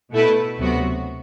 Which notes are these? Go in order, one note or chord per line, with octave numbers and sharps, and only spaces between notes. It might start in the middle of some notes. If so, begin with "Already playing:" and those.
B2 A3 E4 B4
D2 C3 F#3 B3 F#4